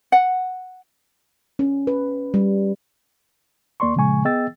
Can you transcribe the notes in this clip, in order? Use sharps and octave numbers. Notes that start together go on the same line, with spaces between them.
F#5
C#4
B4
G3
D#2 A#3 D5 C6 C#6
A#2 C#3 F3 G#3 G#5 C#6
B3 G#4 D#5 G5 E6 A6